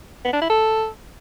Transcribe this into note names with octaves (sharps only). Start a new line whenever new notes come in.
B3
D4
E4
A4